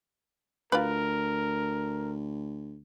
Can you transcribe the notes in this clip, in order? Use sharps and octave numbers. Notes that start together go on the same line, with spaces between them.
D2 F4 G4 A#4 B4